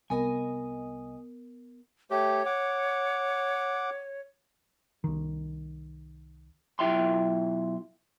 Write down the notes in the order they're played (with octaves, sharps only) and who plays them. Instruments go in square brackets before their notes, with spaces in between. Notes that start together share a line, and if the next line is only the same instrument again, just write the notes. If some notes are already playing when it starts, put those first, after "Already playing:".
[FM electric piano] C2 D#5 D#6 [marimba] B3 A#4 [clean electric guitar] G#5
[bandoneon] A3 G4 [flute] C#5
[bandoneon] F#5 D6
[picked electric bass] C2 D#3
[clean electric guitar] B1 E4 F4 E5 G5 C6